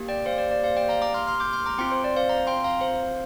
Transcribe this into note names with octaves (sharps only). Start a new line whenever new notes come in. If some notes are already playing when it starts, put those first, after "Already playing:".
Already playing: A#3 G4
D5 G5
C5 F5
D5
D5
C5 F5
D5 G5
F5 A#5
A#5 D6
C6 F6
C6 F6
D6 G6
C6 F6
A#5 D6
C4 F4 G5 C6
C5
D5
C5 F5
F5 A#5
G5 C6
F5 A#5
C5 F5